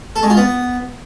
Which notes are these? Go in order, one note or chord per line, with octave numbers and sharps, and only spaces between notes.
A4
G#3
F4
B3